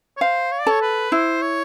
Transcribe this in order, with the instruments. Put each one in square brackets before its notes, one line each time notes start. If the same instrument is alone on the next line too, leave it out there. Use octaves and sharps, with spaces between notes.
[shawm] C#5
[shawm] C5 [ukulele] F5
[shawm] C#5
D5
[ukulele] A4 [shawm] C#5
[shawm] B4
[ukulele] E4 [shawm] C5
[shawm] C#5